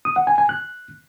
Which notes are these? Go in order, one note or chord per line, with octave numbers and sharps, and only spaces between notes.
D#6
F#5
G#5
G#5
F#6